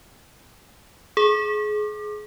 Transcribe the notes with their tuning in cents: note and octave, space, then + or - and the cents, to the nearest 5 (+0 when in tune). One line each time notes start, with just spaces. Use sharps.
G#4 +25 D6 +30